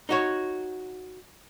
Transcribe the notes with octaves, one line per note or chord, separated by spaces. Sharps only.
D#4 F#4 C#5